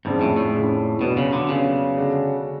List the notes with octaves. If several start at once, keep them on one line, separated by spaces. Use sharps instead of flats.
F2 G#2 C#3 F3 G#3 D4
A2
A2
F2 C#3 F3 G#3 D4
B2 F#3 B3 D4
C#3
D3
C#3 F#3 B3 D4
D3 G#3 D4 F#4